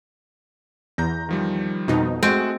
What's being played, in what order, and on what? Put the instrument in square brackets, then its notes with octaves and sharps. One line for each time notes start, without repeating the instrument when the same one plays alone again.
[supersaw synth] E2 [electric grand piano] A#5 G6 A#6
[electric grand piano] D#3 F3 G3
[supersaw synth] F2 B2 D#4
[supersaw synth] G#3 [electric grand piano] A3 F#4 [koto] C4